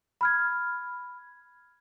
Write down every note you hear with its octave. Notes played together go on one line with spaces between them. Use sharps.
B5 F6 G#6